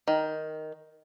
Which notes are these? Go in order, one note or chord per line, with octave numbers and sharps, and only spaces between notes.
D#3